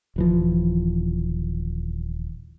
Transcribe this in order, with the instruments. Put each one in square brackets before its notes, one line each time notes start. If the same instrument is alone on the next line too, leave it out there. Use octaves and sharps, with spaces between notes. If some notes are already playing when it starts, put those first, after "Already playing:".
[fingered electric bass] D#1 E3 F3